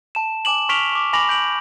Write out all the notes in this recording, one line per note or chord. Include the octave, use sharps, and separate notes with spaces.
A5 E7
G#5 D6 E7 F#7
C#6 F6 B6 D7 F7 G7
C#6 D6
G#5 B5 D6 A#6 F7 F#7
G6 D7 F#7